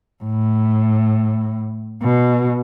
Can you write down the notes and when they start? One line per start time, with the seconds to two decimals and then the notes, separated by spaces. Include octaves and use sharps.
0.24 A2
2.03 B2